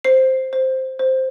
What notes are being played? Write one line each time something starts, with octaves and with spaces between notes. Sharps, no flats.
C5 C7
C5
C5